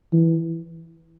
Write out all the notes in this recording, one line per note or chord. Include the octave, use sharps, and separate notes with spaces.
E3